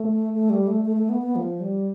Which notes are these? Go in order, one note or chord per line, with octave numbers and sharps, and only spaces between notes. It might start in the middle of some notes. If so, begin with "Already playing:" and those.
Already playing: A3
A3
G3
A3
A3
A3
B3
B3
F3
G3